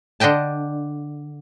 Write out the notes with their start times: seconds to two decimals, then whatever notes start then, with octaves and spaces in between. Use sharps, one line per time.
0.20 D3 D4 D#5 G5 A5